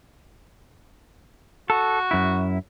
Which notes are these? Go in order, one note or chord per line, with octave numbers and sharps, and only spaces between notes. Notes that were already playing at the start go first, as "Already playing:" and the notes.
F#4 A4
F#2 E4